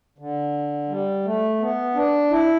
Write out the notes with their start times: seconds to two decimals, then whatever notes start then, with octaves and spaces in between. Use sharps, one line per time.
0.18 D3
0.89 G3
1.25 A3
1.60 B3
1.95 D4
2.31 E4